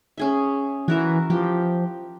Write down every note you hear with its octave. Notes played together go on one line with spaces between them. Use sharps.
C#4 G#4 E5
E3 F#4 A#4 E5
F3 G4